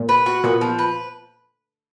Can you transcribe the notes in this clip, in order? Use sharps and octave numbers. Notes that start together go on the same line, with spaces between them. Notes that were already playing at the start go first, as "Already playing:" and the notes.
Already playing: A#2
B4
F#4
A#2 B3
F3
B4